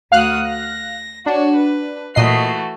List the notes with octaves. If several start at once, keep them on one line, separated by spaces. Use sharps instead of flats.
D2 F#4 F5 D#6 F6 F#6
A#6
D4 F#4 C#5
B4
A#2 E3 A3 F#4 D#5 C7